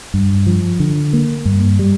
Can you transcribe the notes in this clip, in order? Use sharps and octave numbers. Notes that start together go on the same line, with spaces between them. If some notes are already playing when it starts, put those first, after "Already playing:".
G2
F3
D3
A#3
G2
G3